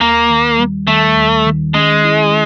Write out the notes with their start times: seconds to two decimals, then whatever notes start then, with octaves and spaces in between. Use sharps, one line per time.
0.01 D#2 A#3
0.30 D#3
0.59 G3
0.87 D#3 A3
1.17 D#2
1.46 D#3
1.74 G#3 C#4
2.04 E4